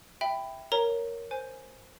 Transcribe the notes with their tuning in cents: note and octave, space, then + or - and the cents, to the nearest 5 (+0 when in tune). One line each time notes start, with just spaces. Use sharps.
E5 +0 G5 +5 B5 +15
A#4 +0 C#5 +0 A#5 +0
C5 +0 G#5 +0